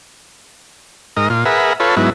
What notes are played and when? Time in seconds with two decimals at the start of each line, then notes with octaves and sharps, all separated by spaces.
1.17 G#2 A#4 D#5
1.30 A#2 F4
1.45 G#4 A#4 B4 E5 F#5
1.80 F4 A4 B4 C#5
1.97 G#2 F#3 B3 E4